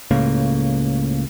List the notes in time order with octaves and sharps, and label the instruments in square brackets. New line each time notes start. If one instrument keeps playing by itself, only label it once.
[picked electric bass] C#2 A2 C#3 A#3